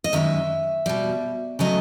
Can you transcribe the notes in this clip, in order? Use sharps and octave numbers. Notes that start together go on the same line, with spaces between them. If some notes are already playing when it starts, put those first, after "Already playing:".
D#5
F#2 D#3 G#3 E5
B2 G3
C#3 F#3 A3 D#5